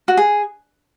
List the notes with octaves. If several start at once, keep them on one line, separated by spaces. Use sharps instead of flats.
F#4
G#4